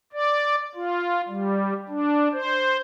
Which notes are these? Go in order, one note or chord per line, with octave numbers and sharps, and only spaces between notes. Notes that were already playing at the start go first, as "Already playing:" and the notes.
D5
F4
G3
D4
C5